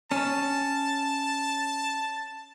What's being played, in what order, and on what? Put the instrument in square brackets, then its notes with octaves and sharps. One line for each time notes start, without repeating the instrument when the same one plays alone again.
[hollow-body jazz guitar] C#4 [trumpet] A5